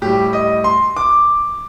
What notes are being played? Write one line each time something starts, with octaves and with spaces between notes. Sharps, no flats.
A2 G3 G4
D#5
C6
D6